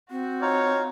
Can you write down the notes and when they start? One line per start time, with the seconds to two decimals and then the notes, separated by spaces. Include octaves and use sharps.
0.11 C4 F#4
0.42 D#4 F4 C#5 F5